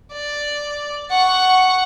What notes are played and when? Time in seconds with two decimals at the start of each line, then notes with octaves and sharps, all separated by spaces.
0.13 D5
1.11 F#5 C#6